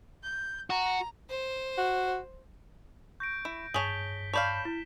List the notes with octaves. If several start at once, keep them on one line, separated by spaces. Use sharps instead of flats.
G6
F#4 A#5
C5
F#4
C#6 G6 A#6 D7
E4
G2 G#4 C#5 A5 B6 G7
C#5 D5 F5 A5 B5 G6 B6 E7
E4